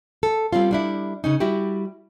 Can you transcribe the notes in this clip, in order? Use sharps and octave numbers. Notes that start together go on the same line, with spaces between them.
A4
G3 C4 C#4 F4
G3 D4 E4
C#3 C#4 D#4
G3 E4 F#4 G4